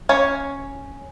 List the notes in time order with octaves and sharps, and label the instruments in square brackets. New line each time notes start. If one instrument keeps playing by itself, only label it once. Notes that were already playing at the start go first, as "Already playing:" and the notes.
[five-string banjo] C#4 C#5 F5